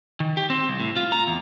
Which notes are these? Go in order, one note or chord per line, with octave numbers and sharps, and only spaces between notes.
D#3
G4
C4
C2
A2
F4
A#5
E2